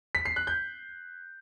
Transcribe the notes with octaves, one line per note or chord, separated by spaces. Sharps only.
B6
C7
F#6
G6